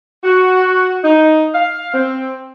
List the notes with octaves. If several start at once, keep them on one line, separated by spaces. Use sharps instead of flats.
F#4
D#4
F5
C4